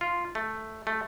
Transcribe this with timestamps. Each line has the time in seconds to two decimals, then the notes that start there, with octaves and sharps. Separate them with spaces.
0.01 F4
0.35 A3
0.87 A3